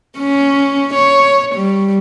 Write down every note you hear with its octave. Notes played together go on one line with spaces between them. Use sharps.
C#4
C#5
G3